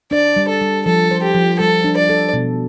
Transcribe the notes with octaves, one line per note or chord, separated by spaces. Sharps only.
D4 D5
G3
A4
G3
F3 A4
C5
G4
F3
G3 A4
D4
D5
A4
B2